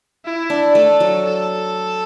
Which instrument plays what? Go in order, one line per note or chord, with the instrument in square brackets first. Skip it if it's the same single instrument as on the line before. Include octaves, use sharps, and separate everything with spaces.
[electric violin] E4
[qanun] D4
[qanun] A3 [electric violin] A4
[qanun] F#3
[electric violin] A4